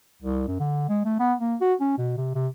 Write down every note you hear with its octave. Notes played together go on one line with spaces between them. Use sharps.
C2
F#2
D3
G#3
A3
B3
A#3
F#4
C#4
B2
C3
C3